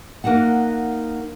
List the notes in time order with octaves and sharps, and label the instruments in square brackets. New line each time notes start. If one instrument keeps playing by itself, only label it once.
[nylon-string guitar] A#3 D#4 F#4 F#5